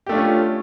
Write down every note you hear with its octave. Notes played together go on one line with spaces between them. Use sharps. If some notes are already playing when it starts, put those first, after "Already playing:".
A3 C#4 D4 F4 G4